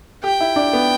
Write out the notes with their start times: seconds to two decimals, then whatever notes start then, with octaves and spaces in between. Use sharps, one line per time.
0.24 G4 G5
0.41 E4
0.56 D4
0.73 B3